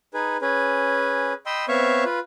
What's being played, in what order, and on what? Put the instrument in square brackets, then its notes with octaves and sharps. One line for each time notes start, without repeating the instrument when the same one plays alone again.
[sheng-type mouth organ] D#4 G#4 B4
C#4 G#4 B4
D#5 G5 B5 C6 E6
B3 C4 C#5 E5 F5 C#6
F4 B4